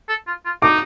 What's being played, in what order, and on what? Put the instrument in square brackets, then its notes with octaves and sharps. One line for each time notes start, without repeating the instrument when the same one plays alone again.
[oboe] A4
F4
F4
[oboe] D#4 [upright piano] D6